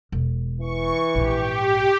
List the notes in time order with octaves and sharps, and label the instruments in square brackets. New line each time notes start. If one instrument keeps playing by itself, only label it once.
[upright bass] E1
[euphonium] E3 [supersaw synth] C#6
[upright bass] A#1 G#2 [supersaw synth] G4